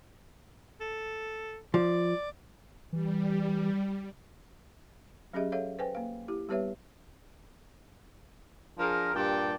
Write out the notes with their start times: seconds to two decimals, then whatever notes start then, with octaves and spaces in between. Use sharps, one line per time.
0.81 A4
1.74 F3 D5
2.93 E3 G3
5.33 F#3 C#4 G4 G#4 D#5 E5
5.52 A4 C#5 E5 F5
5.79 B4 C5 G5 G#5
5.95 A#3 F5
6.28 E4 G4
6.49 G3 B3 G4 B4 C#5 E5
8.79 F3 D4 G#4 A#4
9.14 G2 A#2 G4 D5 G5 A5